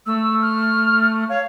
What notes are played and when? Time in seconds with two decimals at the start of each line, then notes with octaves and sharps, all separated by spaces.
0.06 A3 E6
0.42 F6
1.29 C#5 F5